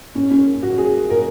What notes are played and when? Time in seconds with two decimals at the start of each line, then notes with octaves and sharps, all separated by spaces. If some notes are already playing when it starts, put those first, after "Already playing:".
0.15 C#4
0.31 C#4
0.63 F#4
0.78 G#4
1.10 A#4